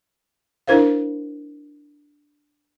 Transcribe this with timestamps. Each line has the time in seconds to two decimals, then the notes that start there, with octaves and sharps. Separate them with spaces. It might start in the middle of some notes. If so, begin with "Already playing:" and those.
0.67 D4 E4 A#4 C5 F5